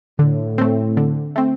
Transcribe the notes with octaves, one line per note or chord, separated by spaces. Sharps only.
A2 D3
A3 C4
D3
A3 C4